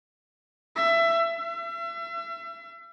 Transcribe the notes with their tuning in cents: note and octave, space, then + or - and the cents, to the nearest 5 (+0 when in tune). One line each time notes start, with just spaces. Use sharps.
E5 +20
E5 +40